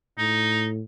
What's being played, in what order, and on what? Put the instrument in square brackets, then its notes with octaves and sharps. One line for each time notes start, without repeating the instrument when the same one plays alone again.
[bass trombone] A2 [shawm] D#4